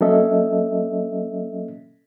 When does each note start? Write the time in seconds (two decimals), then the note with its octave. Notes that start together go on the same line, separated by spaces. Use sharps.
0.01 F#3 A#3 C#4 A4 D#5 E5